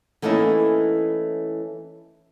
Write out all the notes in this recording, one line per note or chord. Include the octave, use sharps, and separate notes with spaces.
E3 A3 A#3 C#4 D#4 E4